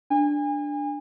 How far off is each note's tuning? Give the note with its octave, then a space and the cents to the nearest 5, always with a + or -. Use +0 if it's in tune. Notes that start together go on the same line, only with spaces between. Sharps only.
D4 +0 G#5 -35